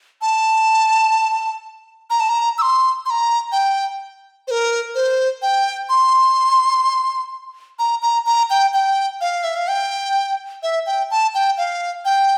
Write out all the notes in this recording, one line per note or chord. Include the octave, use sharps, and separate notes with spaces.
A5
A#5
A5
A#5
E6
C6
C6
A#5
G5
C5
A#4
C5
G5
C6
A#5
A#5
A#5
G5
G5
F5
E5
F5
G5
E5
G5
A5
G5
F5
G5